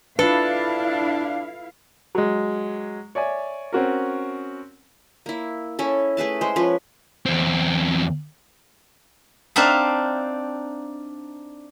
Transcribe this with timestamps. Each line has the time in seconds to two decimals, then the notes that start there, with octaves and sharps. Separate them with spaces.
0.19 D4 E4 F4 A4 B4 F5
2.15 F#3 G#3
3.15 C#5 D5 E5 G#5
3.73 C4 C#4 F#4 A#4
5.26 A#3 E4
5.79 C#4 E4 A4
6.17 A3 G#4 B4 A5
6.41 G#3 C5
6.56 F3 C#4 B4
7.26 E2 C4
9.56 C4 D4 D#4 E5 F5